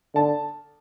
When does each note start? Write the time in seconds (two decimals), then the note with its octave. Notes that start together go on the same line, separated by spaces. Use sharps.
0.15 D3 A5